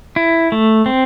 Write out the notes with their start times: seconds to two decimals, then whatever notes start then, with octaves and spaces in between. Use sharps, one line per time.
0.16 E4
0.52 A3
0.86 C4